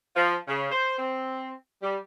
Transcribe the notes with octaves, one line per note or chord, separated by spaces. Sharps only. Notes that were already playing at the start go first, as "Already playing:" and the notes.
F3
C#3
C5
C4
G3